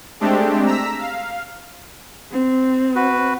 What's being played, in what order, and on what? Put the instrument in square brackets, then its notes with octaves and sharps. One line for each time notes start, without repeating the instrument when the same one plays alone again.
[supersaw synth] G#3 A3 C4 D4 G4
A#5 E6 B6
F5
[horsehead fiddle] C4
[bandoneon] F#4 B4